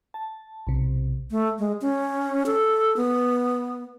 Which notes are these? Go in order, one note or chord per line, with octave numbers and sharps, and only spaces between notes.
A5
B1 C3
A3
G#3
C#4
A4
B3